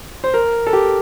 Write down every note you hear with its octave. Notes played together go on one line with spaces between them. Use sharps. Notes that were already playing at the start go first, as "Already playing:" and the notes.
C5
A#4
A4
G4